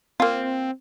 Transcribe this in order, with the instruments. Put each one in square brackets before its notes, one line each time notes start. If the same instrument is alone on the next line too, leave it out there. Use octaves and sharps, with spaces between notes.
[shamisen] A#3 F4 [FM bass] C4